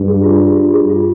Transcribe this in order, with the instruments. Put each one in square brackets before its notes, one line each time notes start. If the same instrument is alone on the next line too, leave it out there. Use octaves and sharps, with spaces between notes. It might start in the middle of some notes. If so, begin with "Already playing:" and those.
Already playing: [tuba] G2
[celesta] G#4
F4
F4
G#4
G#4
F4